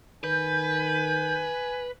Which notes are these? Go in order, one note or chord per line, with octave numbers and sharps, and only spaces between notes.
D#3 B4 G#5 G6